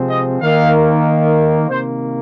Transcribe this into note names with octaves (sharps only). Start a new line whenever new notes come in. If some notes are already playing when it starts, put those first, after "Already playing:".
Already playing: C3 F3 G#3 C4
D#5
D#3 A#3 F5
C3 D#3 A#3 C5